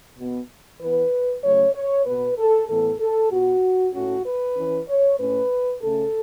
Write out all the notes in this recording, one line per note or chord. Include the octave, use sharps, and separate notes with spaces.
B2 B3
E3 B3 B4
C#3 F#3 A3 C#4 C#5
C#5
B2 B3 B4
A4
A2 E3 B3 A4
A4
B2 B3 F#4
A2 A3 C#4 F#4
B4
E3 C#4
C#5
A2 A3 C#4 B4
C#3 A3 C#4 A4